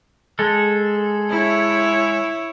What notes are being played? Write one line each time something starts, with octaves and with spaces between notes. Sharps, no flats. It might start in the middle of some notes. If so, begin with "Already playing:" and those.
G#3 A4
E4 C#5